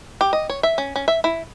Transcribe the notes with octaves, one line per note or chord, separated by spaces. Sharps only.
G4
D#5
C#5
E5
C#4
C#4
E5
E4